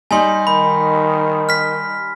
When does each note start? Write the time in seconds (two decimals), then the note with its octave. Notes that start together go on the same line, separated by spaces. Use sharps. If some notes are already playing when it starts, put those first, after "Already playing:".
0.11 G3 D#4 G#5 C6
0.47 D#3 B5
1.49 F6 B6